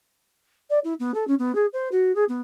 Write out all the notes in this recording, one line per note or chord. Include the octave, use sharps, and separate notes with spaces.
D5
E4
B3
A4
C#4
B3
G#4
C5
F#4
G#4
B3